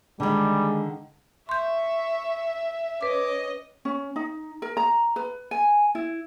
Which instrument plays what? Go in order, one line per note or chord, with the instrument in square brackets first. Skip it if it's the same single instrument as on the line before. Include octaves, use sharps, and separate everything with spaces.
[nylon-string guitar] D3 D#3 [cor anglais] G3 [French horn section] G#3
[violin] E5 [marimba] C6 G6 [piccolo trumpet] C#6
[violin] C#4 D#5 [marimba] B4 [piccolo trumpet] D6
[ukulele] C#4
D#4
A#4
A#5
B4
G#5
E4